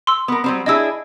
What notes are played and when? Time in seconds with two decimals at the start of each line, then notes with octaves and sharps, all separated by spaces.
0.07 C6 E6
0.28 B3 A#4
0.44 F#3 G3 C4
0.66 D4 E4 G#4 D#5 E6